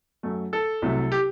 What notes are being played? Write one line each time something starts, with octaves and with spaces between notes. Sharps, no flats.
F#2 F#3 A3
A4
C2 C3 F#3 A3
G4